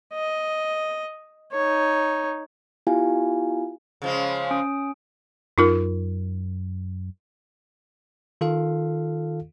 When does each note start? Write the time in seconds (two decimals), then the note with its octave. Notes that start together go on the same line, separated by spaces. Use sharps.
0.15 D#5
1.53 D#4 C#5
2.87 B3 E4 F4 G4 F5 G#5
4.02 C#3 F3 G#3
4.51 C#4 D#6 D7
5.58 F#2 D#4 F4 A#4
8.41 D#3 F4 A4 F5